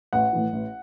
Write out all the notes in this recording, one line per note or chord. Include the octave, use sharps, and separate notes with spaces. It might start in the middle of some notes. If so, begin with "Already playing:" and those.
A1 F#5
A2 E3
A1